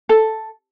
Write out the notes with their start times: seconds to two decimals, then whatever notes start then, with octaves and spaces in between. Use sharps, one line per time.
0.09 A4